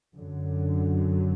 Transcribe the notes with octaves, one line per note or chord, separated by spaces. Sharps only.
F#2 D3 F#3